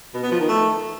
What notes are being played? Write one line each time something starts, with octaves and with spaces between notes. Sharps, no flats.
B2
B3
F3
D#3
A3